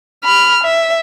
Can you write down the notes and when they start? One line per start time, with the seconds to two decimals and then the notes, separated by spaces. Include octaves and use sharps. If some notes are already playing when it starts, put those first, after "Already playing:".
0.24 B5 F6
0.64 E5